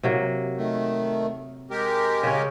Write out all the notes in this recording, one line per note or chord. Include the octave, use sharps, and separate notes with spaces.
C3 F#3 A#3
D#3 A3
G#3 G4 A#4
C#3 C#4